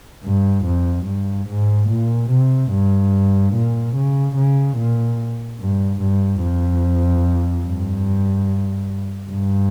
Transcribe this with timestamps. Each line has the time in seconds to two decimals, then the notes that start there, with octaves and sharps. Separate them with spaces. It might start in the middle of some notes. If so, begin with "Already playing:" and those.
0.24 G2
0.65 F2
1.06 G2
1.48 G#2
1.89 A#2
2.30 C3
2.72 G2
3.54 A#2
3.95 C#3
4.36 C#3
4.77 A#2
5.60 G2
6.01 G2
6.43 F2
7.66 G2
9.31 G2